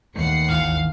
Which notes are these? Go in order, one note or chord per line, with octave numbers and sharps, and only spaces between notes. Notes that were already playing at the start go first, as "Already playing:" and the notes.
D#2 A3 F#5 C7 C#7
G#1 D2 E3 F5